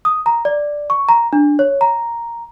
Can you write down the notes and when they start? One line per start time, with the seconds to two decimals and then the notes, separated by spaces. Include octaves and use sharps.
0.05 D#6
0.26 A#5
0.45 D5
0.90 C#6
1.09 A#5
1.33 D4
1.59 C#5
1.81 A#5